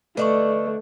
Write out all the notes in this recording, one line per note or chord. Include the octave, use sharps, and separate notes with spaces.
D3 A3 B4 D5 D#5 C#6